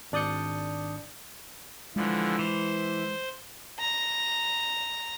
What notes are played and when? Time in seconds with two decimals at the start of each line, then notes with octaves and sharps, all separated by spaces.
0.12 G#1 D4 D5 D#6 G6 C#7
1.96 D3 E3 F3 G#3
2.39 E3 C5
3.80 A#5